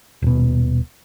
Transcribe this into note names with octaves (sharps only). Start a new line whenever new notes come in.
D#1 B2